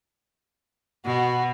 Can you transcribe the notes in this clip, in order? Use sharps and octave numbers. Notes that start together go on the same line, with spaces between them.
B2 F#4